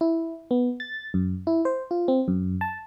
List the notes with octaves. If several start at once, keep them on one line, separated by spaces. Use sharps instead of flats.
E4
B3
A6
F#2
E4
C5
F4
C4
F#2
A5